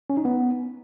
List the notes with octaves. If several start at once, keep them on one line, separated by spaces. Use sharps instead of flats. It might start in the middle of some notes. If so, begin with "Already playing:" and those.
C#4
D#4
B3